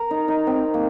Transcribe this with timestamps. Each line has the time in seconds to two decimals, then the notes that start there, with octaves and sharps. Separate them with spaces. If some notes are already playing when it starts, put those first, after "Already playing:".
Already playing: A#4
0.11 D#4
0.28 D#4
0.47 C4
0.74 A#3